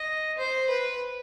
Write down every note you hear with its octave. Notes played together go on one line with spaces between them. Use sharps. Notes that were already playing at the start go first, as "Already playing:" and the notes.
Already playing: D#5
C5
B4